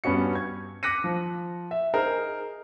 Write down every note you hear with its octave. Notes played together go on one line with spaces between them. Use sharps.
G2 B3 C#4 F#4 C#7
G#6
D6 F#6 A#6 B6 C#7 D#7
F3
E5
D#4 G#4 A#4 C5